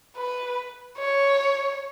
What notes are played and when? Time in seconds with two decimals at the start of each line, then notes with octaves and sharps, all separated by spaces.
0.16 B4
0.98 C#5